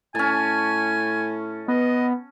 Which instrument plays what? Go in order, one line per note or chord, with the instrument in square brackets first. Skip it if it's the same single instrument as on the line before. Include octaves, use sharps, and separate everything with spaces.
[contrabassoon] A2 [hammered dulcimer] C#4 A5 [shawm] G#5
[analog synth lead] B3 [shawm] D#5